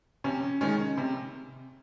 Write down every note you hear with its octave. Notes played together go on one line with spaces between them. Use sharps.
C3 C#4
D#3 G#3 C#4
C3